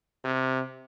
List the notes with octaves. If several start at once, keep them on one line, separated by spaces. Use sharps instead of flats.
C3